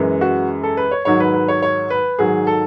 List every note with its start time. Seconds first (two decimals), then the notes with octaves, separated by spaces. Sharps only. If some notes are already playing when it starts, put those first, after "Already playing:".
Already playing: F#2 E3 G#3
0.21 F#4
0.63 A4
0.77 B4
0.91 C#5
1.05 G#2 D#3 F#3 C#5
1.20 B4
1.34 B4
1.48 C#5
1.62 C#5
1.90 B4
2.19 G#2 D#3 F#3 G#4
2.47 A4